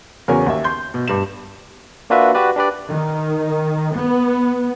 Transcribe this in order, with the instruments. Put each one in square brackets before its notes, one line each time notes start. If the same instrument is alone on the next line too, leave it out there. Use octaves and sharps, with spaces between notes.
[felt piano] E2 C#3 F#4 A#4 C#5 G#5
D#2 E5
C6 G6
B2
G2 E7
[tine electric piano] A#3 D4 F4 F#4 B4 E5
F#4 G4 B4 D5
D4 G4 B4 D5
[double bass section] D#3
B3